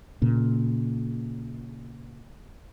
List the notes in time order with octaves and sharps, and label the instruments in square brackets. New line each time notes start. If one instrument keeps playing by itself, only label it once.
[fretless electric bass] A#2 C#3